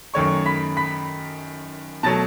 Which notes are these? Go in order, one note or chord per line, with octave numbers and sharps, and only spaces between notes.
F#2 D#3 A3 C#5 C#6
B5 B6
B5 B6
B2 F#3 A3 A5 A6